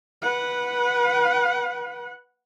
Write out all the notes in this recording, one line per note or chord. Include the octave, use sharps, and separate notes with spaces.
B4 F#5